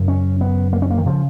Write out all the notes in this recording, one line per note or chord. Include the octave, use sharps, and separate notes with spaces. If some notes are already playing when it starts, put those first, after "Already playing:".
Already playing: F#2 C#3
C#4
B3
A#3
C#4
A#3
D#3
C#3 F3